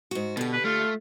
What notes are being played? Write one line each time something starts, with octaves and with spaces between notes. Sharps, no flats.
G#2 F#4
B2 D3 G4
B4
A3 F4